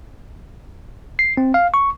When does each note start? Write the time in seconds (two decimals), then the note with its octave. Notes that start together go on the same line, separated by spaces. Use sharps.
1.19 C7
1.37 C4
1.54 F5
1.74 C#6